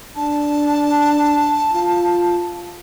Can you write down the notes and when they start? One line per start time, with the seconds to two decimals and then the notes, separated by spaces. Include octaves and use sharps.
0.16 D4 A5
1.72 F4